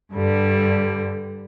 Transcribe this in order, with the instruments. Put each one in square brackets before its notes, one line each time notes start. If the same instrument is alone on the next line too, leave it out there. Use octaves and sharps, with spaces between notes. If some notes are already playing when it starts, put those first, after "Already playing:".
[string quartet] G2 D3 G3